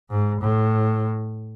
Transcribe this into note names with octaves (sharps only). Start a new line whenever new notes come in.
G#2
A2